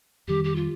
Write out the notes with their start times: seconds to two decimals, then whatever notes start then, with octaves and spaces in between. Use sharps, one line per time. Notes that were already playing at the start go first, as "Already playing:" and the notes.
0.27 F2 D#3 G3 G4
0.44 G4
0.56 F4